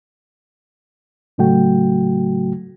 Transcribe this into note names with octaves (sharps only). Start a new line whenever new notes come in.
A2 C#3 F#3 A3 F#4 G5